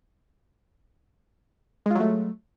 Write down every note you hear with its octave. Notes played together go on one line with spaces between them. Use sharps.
F#3 G#3 A3 F4